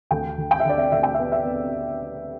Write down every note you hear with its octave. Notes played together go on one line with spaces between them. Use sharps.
D2 G5
D2
G5
E5
D3 D5
E5
D2 E5
G5
B3 E5
E5
B3